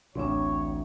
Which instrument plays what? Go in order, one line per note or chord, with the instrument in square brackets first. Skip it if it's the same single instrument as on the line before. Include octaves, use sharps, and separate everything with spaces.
[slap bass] A1 D2 A2 [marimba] C4 D4 [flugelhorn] C#5